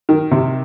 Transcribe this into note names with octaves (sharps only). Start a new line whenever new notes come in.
D#3
C3